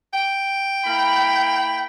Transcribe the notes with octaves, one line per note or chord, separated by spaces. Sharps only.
G5
A#3 E4 B5